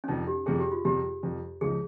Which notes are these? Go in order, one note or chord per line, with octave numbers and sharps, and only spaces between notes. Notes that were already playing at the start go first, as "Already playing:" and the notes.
C#4
F2 C3 G3 D#4
G4
F2 C3 G3 G#4
G4
F4
F2 C3 G3 G4
F2 C3 G3
C#2 C#3 F3 G#3 D#4 G#4